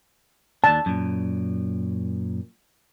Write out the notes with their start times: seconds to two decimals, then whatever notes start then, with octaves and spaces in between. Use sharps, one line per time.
0.64 D#2 D4 A5
0.86 F#2 A#2